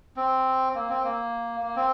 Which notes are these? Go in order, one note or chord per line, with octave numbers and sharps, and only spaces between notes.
C4
A#3
C4
A#3
A#3
C4